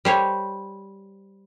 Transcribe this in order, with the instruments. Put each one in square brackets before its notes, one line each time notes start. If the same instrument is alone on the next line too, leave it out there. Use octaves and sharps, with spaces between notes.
[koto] G3 C5 C#5